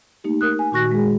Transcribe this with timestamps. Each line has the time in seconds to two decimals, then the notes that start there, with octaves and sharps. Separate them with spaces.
0.24 A3 A#3 D#4 G4
0.41 A#4 D#6 F#6
0.59 G#5
0.72 A#2 D#3 F#4 C#6 F#6 A#6
0.92 G#3 G#4